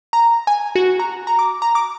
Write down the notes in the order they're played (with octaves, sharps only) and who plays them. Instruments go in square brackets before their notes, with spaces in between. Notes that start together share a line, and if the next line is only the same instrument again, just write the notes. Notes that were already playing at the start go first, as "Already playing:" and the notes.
[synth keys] A#5
G#5
F#4
A#5
A#5
D6
A#5
D6